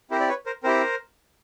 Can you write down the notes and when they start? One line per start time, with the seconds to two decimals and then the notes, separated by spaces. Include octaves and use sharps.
0.11 C4 E4 G4 A#4 C5
0.20 D5
0.29 B4 C#5
0.46 A#4 C5
0.63 C4 E4 G4 A#4 C5